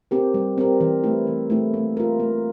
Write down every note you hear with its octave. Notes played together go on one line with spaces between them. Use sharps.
C4 G4 A#4
G3
C4 G4 A#4
E3
A3 E4
E3
A3 E4
A#3
F4 A#4
A#3